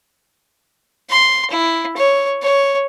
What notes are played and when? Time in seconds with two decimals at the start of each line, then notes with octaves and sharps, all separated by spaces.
1.10 C6
1.50 E4
1.97 C#5
2.42 C#5